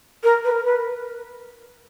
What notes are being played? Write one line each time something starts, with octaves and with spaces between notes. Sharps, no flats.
A#4
B4
A#4
B4